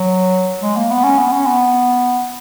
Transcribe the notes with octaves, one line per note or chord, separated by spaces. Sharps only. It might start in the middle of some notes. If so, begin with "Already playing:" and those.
Already playing: F#3
G#3
A#3
B3
C#4
B3
C#4
B3